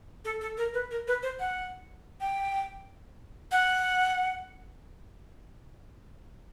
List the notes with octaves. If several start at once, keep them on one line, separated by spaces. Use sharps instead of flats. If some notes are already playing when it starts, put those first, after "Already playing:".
A4
A4
A#4
B4
A#4
B4
C5
F#5
G5
F#5